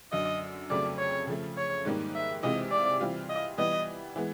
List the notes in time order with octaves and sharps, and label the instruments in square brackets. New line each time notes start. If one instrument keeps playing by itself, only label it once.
[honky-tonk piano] F#2 D3 F#3 [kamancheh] D#5
[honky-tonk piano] F2 C#3 F#3 A3 [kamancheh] D5
[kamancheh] C#5
[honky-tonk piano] C#3 F3 A3
[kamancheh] C#5
[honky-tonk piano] G#2 D#3 G3 A#3 D#4
[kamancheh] E5
[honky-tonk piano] C3 E3 G#3 C4 F4 [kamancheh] D#5
[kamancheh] D5
[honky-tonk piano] E3 G3 C4 F4
[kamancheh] D#5
[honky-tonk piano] E3 G3 B3 [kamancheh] D#5
[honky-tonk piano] E3 G#3 B3